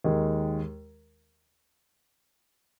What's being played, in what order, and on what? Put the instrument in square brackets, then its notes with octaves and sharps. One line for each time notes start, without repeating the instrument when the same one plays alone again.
[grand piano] D#2 D#3 G#3